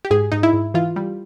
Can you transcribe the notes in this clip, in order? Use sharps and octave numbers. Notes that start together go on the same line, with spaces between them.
G4
G#2 G#4
G#2 D#4
E4
G#2
E3 F4
G3